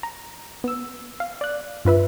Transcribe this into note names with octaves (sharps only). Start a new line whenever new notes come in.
A#5
B3 E6
F5
D5 F#6
G2 F4 B4 E5